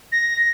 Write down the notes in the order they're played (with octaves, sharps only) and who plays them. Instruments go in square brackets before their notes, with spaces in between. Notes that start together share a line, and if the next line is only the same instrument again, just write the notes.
[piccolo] A#6